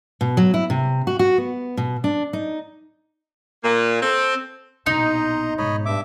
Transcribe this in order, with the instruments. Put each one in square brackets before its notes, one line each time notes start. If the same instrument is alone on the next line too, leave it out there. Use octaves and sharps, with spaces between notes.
[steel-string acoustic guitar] B2
F#3
E4
C3
F#4
F#4
B3
B2
D4
D#4
[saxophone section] A#2 A#3
C4 A4
[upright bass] A#1 B2 [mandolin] D#4 [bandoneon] D#5 A#5 C6
[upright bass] G#2 B2 [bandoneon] C#5 D#5 B5
[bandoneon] G2 E5 D6